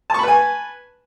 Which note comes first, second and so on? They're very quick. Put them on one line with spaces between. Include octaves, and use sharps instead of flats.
A5 C#6 B5 B4 G#5